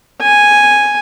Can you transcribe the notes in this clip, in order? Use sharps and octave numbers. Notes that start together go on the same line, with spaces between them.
G#5